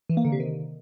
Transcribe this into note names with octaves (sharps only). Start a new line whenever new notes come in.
E3
A#3
D3
C3
D#3